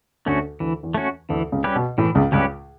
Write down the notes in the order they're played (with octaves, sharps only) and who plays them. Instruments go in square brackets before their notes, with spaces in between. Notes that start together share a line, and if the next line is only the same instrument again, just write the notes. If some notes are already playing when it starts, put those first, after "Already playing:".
[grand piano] D2 D3 [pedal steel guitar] A3 C#4 F#4
[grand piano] D2 D3 [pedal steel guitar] E3
[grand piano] E2 E3
[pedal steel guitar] A3 C#4 F#4
[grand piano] D2 D3 [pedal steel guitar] E3
[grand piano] C#2 C#3
[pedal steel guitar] G3 C#4 G4 B4
[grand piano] B2
[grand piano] A2 [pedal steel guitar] E3
[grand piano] C#2 C#3
[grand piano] C#2 C#3 [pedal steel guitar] G3 C#4 G4 B4